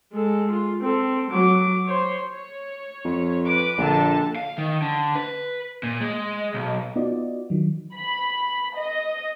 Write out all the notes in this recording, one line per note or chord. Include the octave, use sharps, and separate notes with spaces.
G#3 A4
F4
C4 A4
F#3 D6
C5 C#5
C#5
F2
B4 D6
A#1 D3 A5
F5
D#3
D3
B4
A#2
G#3
B1
B3 D#4 F4 F#4 D5 D#5
D#3 F#3
B5
D#5